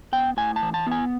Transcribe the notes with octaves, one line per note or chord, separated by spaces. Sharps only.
B3 G5
A2 G#5
A5
E3
A5
B3 G#5